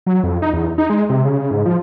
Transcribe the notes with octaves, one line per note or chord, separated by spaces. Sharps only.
F#3
F2
D#4
E2
D#4
G#3
C3
C#3
G#2
F3